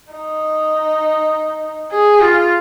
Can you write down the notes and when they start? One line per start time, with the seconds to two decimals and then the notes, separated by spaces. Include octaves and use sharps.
0.12 D#4
1.91 G#4
2.21 F4